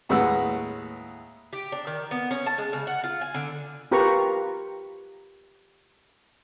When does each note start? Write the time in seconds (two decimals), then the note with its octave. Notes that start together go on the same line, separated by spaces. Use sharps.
0.09 D#2 A2 G#3 B4 F#5 E6
1.53 G4
1.72 D4
1.87 D#3
2.11 B3
2.31 C#4
2.46 A5
2.58 G#3
2.73 C#3
2.87 F#5
3.04 F4
3.21 G#5
3.35 D3
3.92 F4 G4 A#4 B4 A#5 C#6